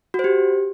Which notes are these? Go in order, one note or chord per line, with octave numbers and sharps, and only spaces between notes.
F#4
C5
G4